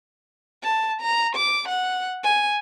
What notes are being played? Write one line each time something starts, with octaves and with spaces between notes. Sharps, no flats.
A5
A#5
D6
F#5
G#5